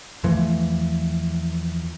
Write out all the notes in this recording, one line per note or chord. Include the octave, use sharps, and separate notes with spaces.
E2 E3 F3 A3